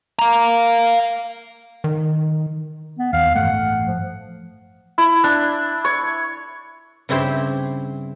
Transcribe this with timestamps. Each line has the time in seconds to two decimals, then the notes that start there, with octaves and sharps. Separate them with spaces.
0.19 F5 A#5
1.84 D#3
2.99 B3
3.13 D#2 F5
3.35 A1 G2 A3 F#5
3.86 F3
4.98 E4
5.24 D4
5.85 C#5
7.09 G2 C#3 C4 E4 G4 C6